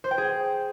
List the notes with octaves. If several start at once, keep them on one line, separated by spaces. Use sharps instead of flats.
C5
G5
G#4